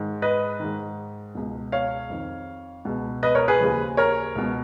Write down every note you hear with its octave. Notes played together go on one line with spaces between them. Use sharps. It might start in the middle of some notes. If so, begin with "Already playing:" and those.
Already playing: G#2 D#3
B4 D#5
G#2 D#3
C#2 B2
C#5 F5
F2 D#3
C#2 B2
B4 D#5
A#4 C#5
G#4 B4
D#2 C#3 F3
A#4 C#5
C#2 B2